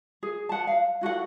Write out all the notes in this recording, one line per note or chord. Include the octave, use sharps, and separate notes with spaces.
G#4
F#5 A5
F5
E4 F#4 A4 F#5